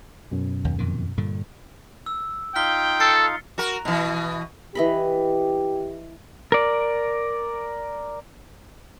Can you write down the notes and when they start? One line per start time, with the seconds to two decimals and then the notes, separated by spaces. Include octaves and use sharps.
0.31 F#2 B2
0.65 D#2
0.79 F2 A#2 D#3
1.17 G2 A#2 D3
2.06 E6
2.56 D#4 F4 F5 G5 F6 B6 G7
3.00 A4 A6 C7 C#7
3.58 F#4 A#4
3.85 B2 E3
4.75 E3 G4 D#5 B5
6.52 A#4 D5